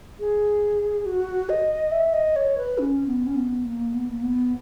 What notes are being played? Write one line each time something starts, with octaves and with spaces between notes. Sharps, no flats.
G#4
F#4
D#5
E5
D#5
C#5
B4
C#4
B3
C#4
B3
A#3
B3
A#3
B3